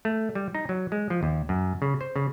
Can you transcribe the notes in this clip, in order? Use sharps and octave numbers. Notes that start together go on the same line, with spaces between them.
A3
G3
D#4
F#3
G#3
F3
D#2
F#2
C#3
C5
C#3